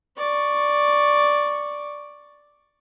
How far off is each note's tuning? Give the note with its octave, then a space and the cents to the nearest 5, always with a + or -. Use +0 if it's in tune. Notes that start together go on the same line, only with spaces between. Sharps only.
D5 +0 C#6 +0